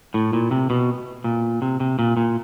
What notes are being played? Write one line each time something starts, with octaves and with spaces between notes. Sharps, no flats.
A2
A#2
C3
B2
A#2
C3
C3
A#2
A#2